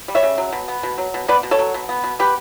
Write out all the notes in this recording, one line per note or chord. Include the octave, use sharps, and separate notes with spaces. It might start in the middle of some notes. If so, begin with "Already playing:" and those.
G3
C#5 E5
C#3
F#3
B2
B3
B2
F#3
B2
B3 B4 D5
B2
A4 C#5
F#3
B2
B3
B2
B3 G4 B4